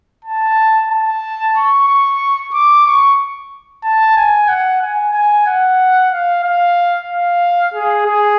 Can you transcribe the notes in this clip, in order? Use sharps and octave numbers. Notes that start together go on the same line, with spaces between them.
A5
A5
C#6
C#6
D6
C#6
A5
G#5
F#5
G#5
G#5
F#5
F5
F5
F5
G#4
G#4